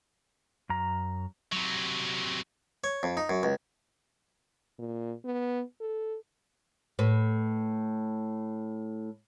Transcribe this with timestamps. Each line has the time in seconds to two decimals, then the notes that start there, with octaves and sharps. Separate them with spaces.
0.69 F#2 A#5
1.52 C3 F#3
2.84 C#5
3.03 F2
3.17 D#4
3.29 F#2
3.43 C#2
4.79 A#2
5.24 B3
5.81 A4
6.99 A2 B4